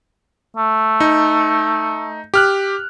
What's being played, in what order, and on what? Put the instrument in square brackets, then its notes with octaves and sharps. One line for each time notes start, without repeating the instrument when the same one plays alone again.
[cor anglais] A3
[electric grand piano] D#4
G4 F6 F#6